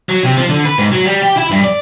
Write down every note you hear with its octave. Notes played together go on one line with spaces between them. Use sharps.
F#3
C3
F3
D3
B4
G#2
F#3
G3
G4
E4
G2
D5